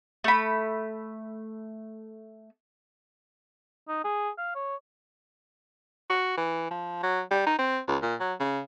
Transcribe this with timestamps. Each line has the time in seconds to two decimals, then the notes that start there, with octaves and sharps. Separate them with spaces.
0.24 A3 B5
3.88 D#4
4.04 G#4
4.38 F5
4.55 C#5
6.10 F#4
6.38 E3
6.71 F3
7.03 F#3
7.31 G3
7.46 D#4
7.59 C4
7.88 C#2
8.02 A#2
8.20 F#3
8.40 C#3